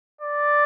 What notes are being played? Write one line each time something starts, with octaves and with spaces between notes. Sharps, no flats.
D5